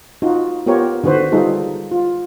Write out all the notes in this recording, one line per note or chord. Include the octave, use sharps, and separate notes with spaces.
D#4 F4 F#4
B3 F4 G4 A#4 C#5
D3 D#3 F#4 B4 C5
G3 D#4 F4 G#4 A4
F4